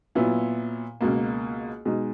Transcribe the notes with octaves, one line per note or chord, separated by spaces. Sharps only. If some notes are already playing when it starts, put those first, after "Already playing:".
A#2 F#3 B3 E4
C#2 B2 A#3
B2 G#3 D#4